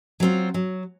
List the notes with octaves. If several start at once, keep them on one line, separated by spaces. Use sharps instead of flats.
F#3 C4 F4
F#3